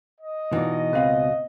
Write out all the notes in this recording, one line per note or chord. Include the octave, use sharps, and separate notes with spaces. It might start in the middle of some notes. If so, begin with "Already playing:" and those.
D#5
B2 E3 D#4 F4 D5
C#2 C4 B4 F5 F#5